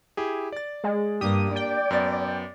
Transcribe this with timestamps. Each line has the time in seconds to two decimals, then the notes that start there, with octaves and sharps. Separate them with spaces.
0.17 E4 G4 G#4
0.52 D5 A6
0.84 G#3
1.21 G2 A#3 D4 G4 D#6
1.56 D5 G5
1.91 F#2 B3 A6